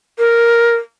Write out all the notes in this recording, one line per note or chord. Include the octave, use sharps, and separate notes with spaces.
A#4